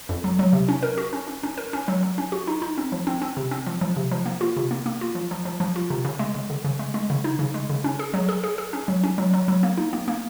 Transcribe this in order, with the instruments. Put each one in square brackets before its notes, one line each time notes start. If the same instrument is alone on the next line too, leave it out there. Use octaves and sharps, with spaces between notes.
[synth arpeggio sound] F2
F#3
F#3
C3
C#4
A#4
F#4
C#4
C#4
C#4
A#4
C#4
F#3
F#3
C#4
F#4
D#4
D#4
C4
F3
C4
C4
C3
C4
F3
F3
C3
F3
A#3
F4
C3
A#3
A#3
F4
F3
F3
F3
F3
F4
C3
C#3
G#3
C#3
C#3
C#3
G#3
G#3
C#3
D#4
C#3
G#3
C#3
C#4
G#4
F#3
G#4
G#4
G#4
C#4
F#3
C#4
F#3
F#3
F#3
A#3
D#4
A#3
A#3